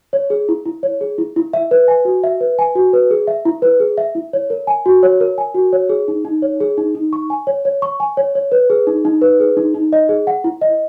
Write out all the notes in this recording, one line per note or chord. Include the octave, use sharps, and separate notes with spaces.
C#5
G#4
E4
E4
C#5
G#4
E4
E4
E5
B4
G#5
F#4
E5
B4
G#5
F#4
B4
G#4
E5
E4
B4
G#4
E5
E4
C#5
A#4
G#5
F#4
C#5
A#4
G#5
F#4
C#5
G#4
D#4
D#4
C#5
G#4
D#4
D#4
C#6
G#5
C#5
C#5
C#6
G#5
C#5
C#5
B4
G#4
D#4
D#4
B4
G#4
D#4
D#4
D#5
G#4
F#5
E4
D#5